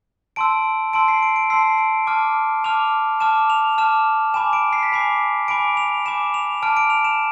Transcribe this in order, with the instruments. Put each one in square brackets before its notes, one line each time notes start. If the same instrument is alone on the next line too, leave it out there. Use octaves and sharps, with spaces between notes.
[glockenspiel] A5 C6 E6 D7
A5 C6 E6 D7
C7
D7
D7
A5 C6 E6 C7
D7
A5 D6 F6
A5 D6 F6 F7
A5 D6 F6 E7
F7
A5 D6 F6 E7
G#5 B5 D6 E7
D7
C7
B6
G#5 B5 D6 C7
G#5 B5 D6 D7
F7
G#5 B5 D6 E7
F7
A5 D6 F6 D7
D7
F7
E7